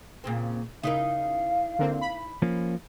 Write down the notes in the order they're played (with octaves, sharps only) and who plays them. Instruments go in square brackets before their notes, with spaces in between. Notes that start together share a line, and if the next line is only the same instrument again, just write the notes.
[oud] A#2 C#3 C4
[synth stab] C#3 [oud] D#4 E4 A#4 [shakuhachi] F5
[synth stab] D3 A#3 C4
B5
[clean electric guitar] F3 A#3 C#4